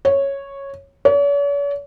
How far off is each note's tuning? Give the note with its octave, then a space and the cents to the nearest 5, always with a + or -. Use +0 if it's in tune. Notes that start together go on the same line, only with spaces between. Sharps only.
C#5 -5
C#5 +45